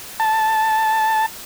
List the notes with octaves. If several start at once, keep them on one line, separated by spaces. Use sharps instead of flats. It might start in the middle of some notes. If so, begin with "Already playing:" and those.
A5